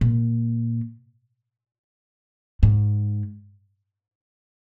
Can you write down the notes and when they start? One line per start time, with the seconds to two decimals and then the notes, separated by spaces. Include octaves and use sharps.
0.01 A#2
2.63 G#2